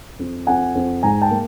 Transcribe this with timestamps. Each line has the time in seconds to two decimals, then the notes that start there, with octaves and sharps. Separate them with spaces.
0.19 F2
0.47 F2 F#5 G#5
0.75 F2
1.03 G#2 G#5 A#5
1.22 G5 A5
1.31 A#3